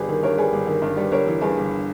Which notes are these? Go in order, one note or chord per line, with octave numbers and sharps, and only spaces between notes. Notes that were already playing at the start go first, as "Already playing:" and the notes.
Already playing: G1 G3 G#4 B4
D#3
G2 A#4 C#5
G3 G#4 B4
G1
D#3
G2
G3 B4
G1 A#4 C#5
E3
G2 G#4 B4
G1